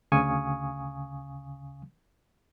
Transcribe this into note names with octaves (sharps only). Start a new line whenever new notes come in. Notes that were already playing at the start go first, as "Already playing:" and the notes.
D2 C#3 F5 G#5 C#6 D#6